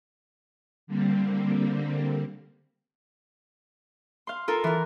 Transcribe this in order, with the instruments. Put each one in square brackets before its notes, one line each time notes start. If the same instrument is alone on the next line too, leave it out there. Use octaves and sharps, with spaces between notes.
[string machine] D3 G3 A#3 C4
[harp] F5 C6
F4 A4 A#4
E3 A#4